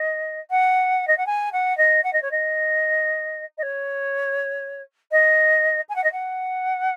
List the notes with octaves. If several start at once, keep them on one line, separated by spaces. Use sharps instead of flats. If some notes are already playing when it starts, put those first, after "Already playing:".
Already playing: D#5
F#5
D#5
F#5
G#5
F#5
D#5
F#5
D#5
C#5
D#5
D#5
C#5
D#5
G#5
F#5
D#5
F#5